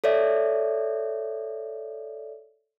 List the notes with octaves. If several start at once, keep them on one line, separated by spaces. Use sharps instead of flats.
A4 C#5 D5 E5